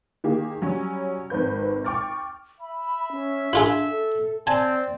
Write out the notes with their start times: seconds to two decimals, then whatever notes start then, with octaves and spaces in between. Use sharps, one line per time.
0.24 D#3 A#3 G4 G#4
0.62 F#3 G3 C#4
1.30 G#1 C4 B4 G6
1.84 G5 C#6 D6 F6 A6
2.60 E5 B5
3.11 C#4
3.53 D4 E4 F4 G#4
3.90 A4
4.47 C4 D5 G#5 A5